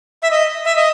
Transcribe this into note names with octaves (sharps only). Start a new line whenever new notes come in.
E5
D#5
E5
D#5